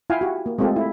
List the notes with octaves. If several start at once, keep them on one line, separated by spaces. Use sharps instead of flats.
E4 F4 F5 G5 G#5
F#4 G4
A#3
G#3 A3 C4 F4 G4 A4
E4